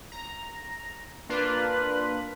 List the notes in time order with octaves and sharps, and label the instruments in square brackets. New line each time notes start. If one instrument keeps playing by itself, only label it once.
[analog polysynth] A#5
[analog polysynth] A#3 D4 F4 [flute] B4